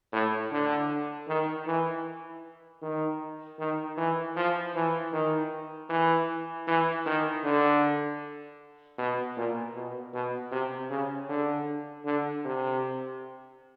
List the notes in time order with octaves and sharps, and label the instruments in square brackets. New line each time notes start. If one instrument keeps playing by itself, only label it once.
[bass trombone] A2
D3
D#3
E3
D#3
D#3
E3
F3
E3
D#3
E3
E3
D#3
D3
B2
A#2
B2
B2
C3
C#3
D3
D3
C3